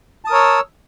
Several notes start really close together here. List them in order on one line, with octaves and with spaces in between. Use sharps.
A5 D#6 A#4 C#5 E6